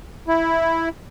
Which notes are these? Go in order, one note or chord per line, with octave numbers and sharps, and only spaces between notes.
E4